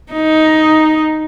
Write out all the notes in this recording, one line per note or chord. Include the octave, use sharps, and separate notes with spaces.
D#4